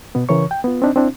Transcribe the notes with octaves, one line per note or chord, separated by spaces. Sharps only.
B2 B3
C#3 E3 A#4 C#5 C#6
G5
B3 F4
C4 D4 D#4
C4 D4 E4